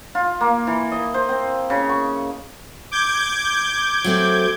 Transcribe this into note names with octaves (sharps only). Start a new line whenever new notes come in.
F4
A#3
E3
D#5
C5
C4
C#3
C#6
D6 G6 G#6
F#3 A3 C4